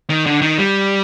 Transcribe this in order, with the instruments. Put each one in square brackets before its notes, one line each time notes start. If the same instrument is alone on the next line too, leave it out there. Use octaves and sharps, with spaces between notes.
[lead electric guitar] D#3
D3
D#3
G3